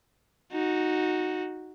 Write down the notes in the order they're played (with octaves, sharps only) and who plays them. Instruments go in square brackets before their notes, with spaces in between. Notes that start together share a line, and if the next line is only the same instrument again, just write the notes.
[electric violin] D#4 F#4